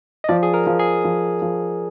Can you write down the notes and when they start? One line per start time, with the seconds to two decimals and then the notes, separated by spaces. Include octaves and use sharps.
0.24 D#5
0.29 F3 D5
0.43 G#4
0.54 A#4
0.66 F3
0.79 G#4
1.04 F3
1.42 F3